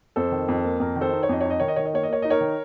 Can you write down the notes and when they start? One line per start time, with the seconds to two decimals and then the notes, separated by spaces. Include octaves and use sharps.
0.16 F2 A4 C5
0.32 D#3
0.48 F2
0.64 A#3
0.80 F2 A#4
0.96 D#3
1.01 A4 C5
1.13 D#4
1.23 C#5
1.29 F2 D#5
1.41 C#5
1.45 D#4
1.50 D#5
1.60 D#3 C#5
1.68 D#5
1.76 D#3 C#5
1.85 D#5
1.93 A#3 C#5
2.03 D#5
2.09 A#3 C#5
2.22 D#4 D#5
2.30 A#4 C#5
2.41 D#3